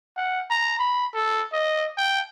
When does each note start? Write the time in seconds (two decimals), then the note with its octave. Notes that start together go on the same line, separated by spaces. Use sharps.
0.17 F#5
0.50 A#5
0.79 B5
1.14 A4
1.53 D#5
1.97 G5